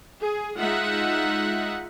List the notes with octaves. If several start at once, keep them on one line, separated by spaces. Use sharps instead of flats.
G#4
G#3 D#4 F4 E5 F#5